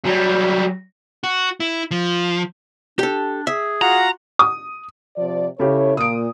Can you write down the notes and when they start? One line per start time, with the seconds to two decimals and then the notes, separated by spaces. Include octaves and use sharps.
0.04 F#3 G3
1.24 F#4
1.60 E4
1.91 F3
2.99 D4 G4 A4
3.47 G#4 E5
3.82 F4 F#4 F#5 A#5
4.39 D#6
5.16 C3 F3 D5
5.60 C#3 E4 G4 A4 C#5
5.97 A#2 D#6 D7